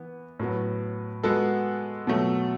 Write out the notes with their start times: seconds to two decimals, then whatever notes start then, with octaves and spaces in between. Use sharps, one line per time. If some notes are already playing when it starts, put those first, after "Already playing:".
Already playing: E3 B3
0.40 A2 F#3 B3
1.23 G#3 B3 F#4 A4
2.07 B2 F#3 A3